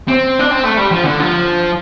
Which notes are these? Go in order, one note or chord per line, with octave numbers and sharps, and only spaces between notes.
C4
D4
C4
A3
G3
F3
D3
F3